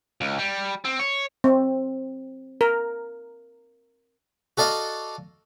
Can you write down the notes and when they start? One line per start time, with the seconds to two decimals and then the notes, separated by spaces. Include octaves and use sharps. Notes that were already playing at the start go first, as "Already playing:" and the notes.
0.21 C#2
0.39 G3
0.85 C4
0.99 C#5
1.44 C4
2.61 A#4
4.58 F#4 A4 D5 D#5 F5